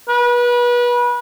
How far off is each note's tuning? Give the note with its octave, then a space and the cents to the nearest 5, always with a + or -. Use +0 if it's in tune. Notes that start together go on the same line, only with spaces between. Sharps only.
B4 -30